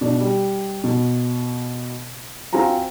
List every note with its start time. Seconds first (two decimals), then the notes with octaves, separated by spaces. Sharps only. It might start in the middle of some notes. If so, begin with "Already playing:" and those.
0.01 B2 D4
0.21 G3
0.84 B2
2.53 C4 F4 F#4 G#5 A#5